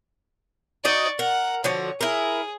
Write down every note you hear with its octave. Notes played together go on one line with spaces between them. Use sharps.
D#4 F#4 D5 D#5 C#6
A#4 F#5
D3 F3 F#4 C#5
E4 G#4 A#4